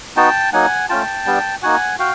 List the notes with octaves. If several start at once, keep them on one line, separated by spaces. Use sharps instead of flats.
B3 D#4 F#4 G5 A5
F#3 A#3 D#4 F#5 G#5
A3 C#4 F4 G5 A5
G3 B3 D4
A#3 D#4 F#4 F#5 G#5
F#4 F5 G5